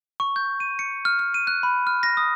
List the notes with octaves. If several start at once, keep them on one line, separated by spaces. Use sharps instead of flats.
C#6
G6
D#7
C#7
F6
F6
D#7
F#6
B5
F6
A#6
D#6